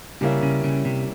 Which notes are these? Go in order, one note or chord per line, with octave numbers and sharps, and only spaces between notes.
C#3 G3 A#3 C#4 E4
C#3
C#3
C3